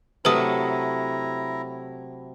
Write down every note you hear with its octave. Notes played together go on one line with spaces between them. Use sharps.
C3 F#3 A3 E4 B4 A#5 D#6